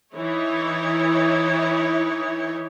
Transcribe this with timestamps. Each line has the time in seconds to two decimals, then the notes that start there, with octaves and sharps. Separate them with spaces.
0.14 E3 D#4 E4 C#5